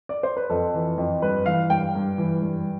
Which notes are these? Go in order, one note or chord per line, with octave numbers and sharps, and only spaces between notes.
D5
C5
B4
F2 A4
E3
F2
G2 B4
E3 F5
G2 G5
G2
E3
G2